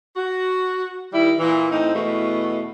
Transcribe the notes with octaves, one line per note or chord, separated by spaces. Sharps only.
F#4
D#3 G3 E4
A#2 E3
A2 C4 D#4
E2 B2 A3